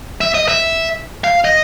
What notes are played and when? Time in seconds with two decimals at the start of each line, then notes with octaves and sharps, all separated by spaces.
0.21 E5
0.34 D#5
0.48 E5
1.24 F5
1.45 D#5